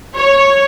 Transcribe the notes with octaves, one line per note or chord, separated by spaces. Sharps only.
C#5